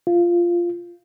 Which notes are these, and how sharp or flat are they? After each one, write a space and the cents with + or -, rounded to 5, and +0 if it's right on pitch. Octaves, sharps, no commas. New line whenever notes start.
F4 -10